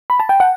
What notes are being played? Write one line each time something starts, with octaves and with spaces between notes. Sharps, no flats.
B5
A5
G5
F#5